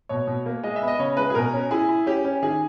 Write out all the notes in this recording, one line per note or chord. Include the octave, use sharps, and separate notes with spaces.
B2 C#5
B2
A#3
G#3 D#5
E5
B3
D#5
C#3 C#5
G#3 B4
G#4
B2 A#4
C#4
E4 G#4
E4
C#4 G4
C#4
D#3 G#4